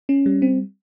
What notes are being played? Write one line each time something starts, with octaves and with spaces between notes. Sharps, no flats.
C#4
G3
C4